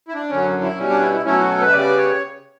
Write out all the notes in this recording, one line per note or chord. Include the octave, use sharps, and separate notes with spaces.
E4
D4
F#2 D3 F#3 C#4
E4
B2 G3 C#4
D4
E4
E4
B2 F#3 A3 C#4 E4
F#4
A4
B4
E5
C#3 G3 B3 D5
C#5